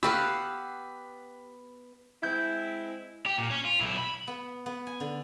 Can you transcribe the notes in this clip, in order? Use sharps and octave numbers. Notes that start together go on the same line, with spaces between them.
B3 C4 G4 F5 F#5 B5 E6
G#3 C4 E4 G6
G4
A#2
C#4
F4
B1 E4
B5
B3
B3
G#5
D3